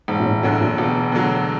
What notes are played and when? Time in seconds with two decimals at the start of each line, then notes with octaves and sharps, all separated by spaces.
0.08 E1 G#2
0.20 A#2
0.26 A2
0.43 D2 A2 D3 F#3
0.61 A#2
0.78 E1 B2
1.12 D2 D3 F#3